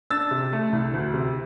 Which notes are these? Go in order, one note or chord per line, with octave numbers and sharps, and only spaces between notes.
D4 E6 A6
C3
A3
C2
D2
C3